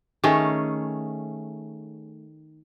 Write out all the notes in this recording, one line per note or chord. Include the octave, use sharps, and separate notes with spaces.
D#3 A3 C#4 G#4